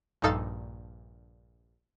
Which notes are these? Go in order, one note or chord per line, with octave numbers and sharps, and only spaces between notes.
A#1 G2 D#4 A4 F5 A6